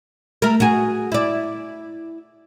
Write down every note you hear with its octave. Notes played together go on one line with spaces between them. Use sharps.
A3 A#4
F#4 G#4
E4 D5